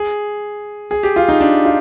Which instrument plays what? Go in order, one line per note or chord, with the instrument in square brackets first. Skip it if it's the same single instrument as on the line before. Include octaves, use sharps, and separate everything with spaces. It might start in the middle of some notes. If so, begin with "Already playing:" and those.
Already playing: [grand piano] G#4
G#4
G4
F4
D#4
D4
F4